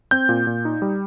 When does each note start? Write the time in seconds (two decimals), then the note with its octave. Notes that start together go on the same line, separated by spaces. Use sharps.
0.11 C4 G6
0.29 A#2
0.47 A#2
0.65 D#4
0.82 G3